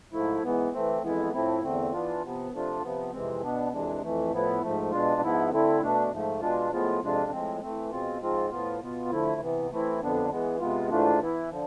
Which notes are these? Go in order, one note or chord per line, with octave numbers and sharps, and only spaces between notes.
G#2 F3 A3 E4
G#2 E3 B3
E3 A3 C4
F2 E3 G#3 B3 E4
A2 F3 A3 C4 E4
E2 D3 A3 C4
E3 B3 D4 F4
C3 F3 B3
C3 F3 A3 D4 F4
C3 F3 B3
F2 C3 E3 G#3 C4
B2 B3 D4
F2 C3 E3 G#3 D4
F2 E3 A3
A2 F3 B3 E4
G#2 F3 A3
B2 G#3 D4 F4
G#2 F3 B3 E4
D3 A3 C4 E4
B2 A3 D4
G#2 F3 A3
B2 G#3 D4 F4
A2 F3 G#3 B3 F4
F2 C3 G#3 D4 F4
A2 F3 G#3 C4
E3 A3 C4
B2 G#3 C4 F4
G#2 F3 G#3 C4 F4
A2 F3 B3 F4
B2 B3 F4
D3 F3 A3 E4
C3 E3 B3
E3 A3 C4 E4
F2 D3 F3 B3 D4
E3 G#3 B3
C3 G#3 B3 F4
G#2 E3 A3 D4 F4
E3 B3 E4
D3 F3